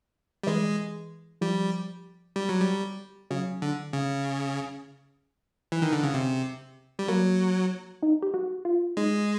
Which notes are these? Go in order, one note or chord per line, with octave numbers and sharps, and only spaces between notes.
G3
E3 G#3
F3 G3
G3
F#3
G3
C#3 F#3
D3
C#3
E3
D#3
D3
C#3
C3
G3
F#3 A#3
D#4
G4
F#4
F4
G#3 D#4